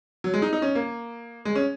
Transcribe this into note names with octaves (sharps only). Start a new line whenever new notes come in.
F#3
G#3
D#4
D#4
C#4
A#3
G#3
C#4